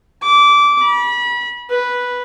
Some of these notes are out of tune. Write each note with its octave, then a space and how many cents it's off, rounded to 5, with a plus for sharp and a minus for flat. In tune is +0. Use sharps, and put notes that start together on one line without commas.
D6 -15
B5 -30
B4 -5